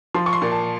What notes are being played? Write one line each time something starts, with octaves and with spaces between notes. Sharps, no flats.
F3 C6
C#6
C6
A#2
A5